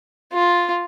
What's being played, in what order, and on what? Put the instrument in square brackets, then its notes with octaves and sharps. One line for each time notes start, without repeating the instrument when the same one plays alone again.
[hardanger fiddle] F4